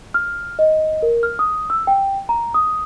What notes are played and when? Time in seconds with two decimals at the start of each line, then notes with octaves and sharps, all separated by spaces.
0.14 F6
0.59 D#5
1.02 A#4
1.23 F6
1.39 D#6
1.70 E6
1.87 G5
2.29 A#5
2.54 D#6